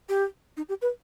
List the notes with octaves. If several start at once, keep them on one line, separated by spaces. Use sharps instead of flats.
G4
D#4
G4
B4